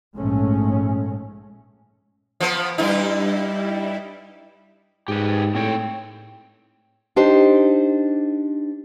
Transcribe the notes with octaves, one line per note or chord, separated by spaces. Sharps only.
A#1 G#2 G#3 A3 C#4
F3 B3
G2 G3 D#4 E4
G#2 G4 G#4 B4
A2 C4 C#5 G5
D4 D#4 G4 C5